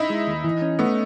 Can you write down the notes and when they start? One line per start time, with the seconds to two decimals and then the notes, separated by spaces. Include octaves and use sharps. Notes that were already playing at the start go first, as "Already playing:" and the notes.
Already playing: D#4 E4
0.10 G#3
0.27 D#2
0.44 E3
0.62 C#4
0.79 A3 B3